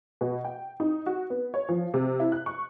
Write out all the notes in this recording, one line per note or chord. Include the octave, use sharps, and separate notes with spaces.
B2
G5
D#4
F#4
B3
C#5
F3
C3
E4
F#6
C#6